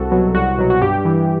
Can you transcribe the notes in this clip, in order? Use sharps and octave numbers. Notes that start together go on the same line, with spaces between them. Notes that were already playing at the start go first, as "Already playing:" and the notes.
Already playing: C2 F#4 A4
B2 F#3
C2 F#4
B2 F#3
F#4
G2 G4
E3